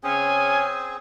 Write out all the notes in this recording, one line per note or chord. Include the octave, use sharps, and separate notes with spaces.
C#3 C4 C#4 G#4 G#5